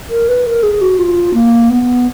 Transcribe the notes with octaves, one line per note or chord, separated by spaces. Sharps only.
A#4
B4
A#4
G#4
F#4
F4
A#3
B3